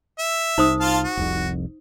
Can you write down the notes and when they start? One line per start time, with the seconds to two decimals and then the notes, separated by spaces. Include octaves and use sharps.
0.19 E5
0.58 C2 D#4 C5 D#6
0.80 F4 F5 A5
1.04 F#4
1.17 F1 C2 F2